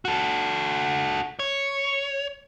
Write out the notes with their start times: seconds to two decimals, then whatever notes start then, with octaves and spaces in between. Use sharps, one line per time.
0.05 F#4 A4
1.39 C#5